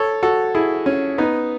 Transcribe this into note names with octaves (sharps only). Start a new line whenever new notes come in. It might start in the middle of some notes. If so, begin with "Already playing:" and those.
Already playing: A4 C#5
F#4 A4
E4 G#4
C#4
B3 D#4